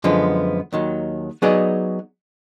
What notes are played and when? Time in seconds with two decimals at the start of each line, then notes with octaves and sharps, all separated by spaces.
0.04 F#2 D3 F3 G#3 B3
0.73 D#2 D#3 F#3
1.42 F#3 B3 D#4 G#4 D5